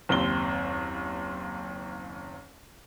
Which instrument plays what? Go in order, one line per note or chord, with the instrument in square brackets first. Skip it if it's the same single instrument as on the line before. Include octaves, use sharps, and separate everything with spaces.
[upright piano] F#1 D#2 C4 G7